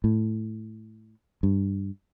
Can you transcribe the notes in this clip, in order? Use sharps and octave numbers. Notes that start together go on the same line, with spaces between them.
A2
G2